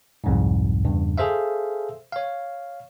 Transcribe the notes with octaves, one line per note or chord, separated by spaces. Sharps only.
C2 F2 G#2
E2 G2 C#3
G#4 A4 C5 E5 F5
C#5 F5